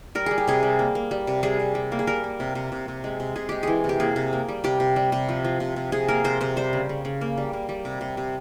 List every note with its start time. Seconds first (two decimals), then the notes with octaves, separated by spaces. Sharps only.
0.15 G3 A#4
0.26 G3 G#4
0.38 G4
0.47 C3 G#4
0.63 G3
0.79 A#3
0.95 A#3
1.11 G3
1.27 C3
1.43 G3 G#4
1.60 C3
1.75 G3
1.92 A#3
1.99 G#4
2.07 G3 A#4
2.24 A#3
2.40 C3
2.55 C3
2.72 C3
2.88 C3
3.04 G#3
3.20 C3
3.36 C3 G#4
3.49 G#3 G4
3.63 E3 G#4
3.84 C3
3.89 G4
4.00 A#3 G#4
4.16 C3
4.33 A#3
4.48 G3
4.64 C3 G4
4.80 C3
4.96 G3
5.12 C3
5.29 F3
5.44 F3
5.60 C3
5.76 C3
5.92 C3 G#4
6.08 A#3 A#4
6.24 C3 C5
6.41 C3 C5
6.56 G3 C5
6.73 C#3
6.89 C#3
7.05 C#3
7.21 A#3
7.38 G3
7.53 A#3
7.69 G3
7.85 C3
8.01 C3
8.17 C3